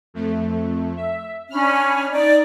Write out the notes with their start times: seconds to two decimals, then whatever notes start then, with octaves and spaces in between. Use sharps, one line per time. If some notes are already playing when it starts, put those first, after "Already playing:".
0.14 F2 A3
0.97 E5
1.50 C#4 D4 B5 F6
2.11 D#4 D5